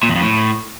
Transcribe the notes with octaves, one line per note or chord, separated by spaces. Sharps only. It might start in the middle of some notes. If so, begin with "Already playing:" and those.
A#2
E2
F2
A2